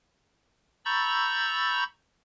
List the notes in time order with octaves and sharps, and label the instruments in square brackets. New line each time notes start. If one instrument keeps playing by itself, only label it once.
[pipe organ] A#5 B5 C#6 E6 G6 A6